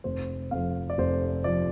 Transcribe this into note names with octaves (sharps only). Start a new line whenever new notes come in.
F1 C5
F2 F3 F5
D5
F1 C5
F3 D5